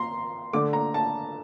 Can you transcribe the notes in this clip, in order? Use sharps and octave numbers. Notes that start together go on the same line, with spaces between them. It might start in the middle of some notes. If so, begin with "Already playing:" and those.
Already playing: A#5 C6
D3 A3 D6
A#5
A5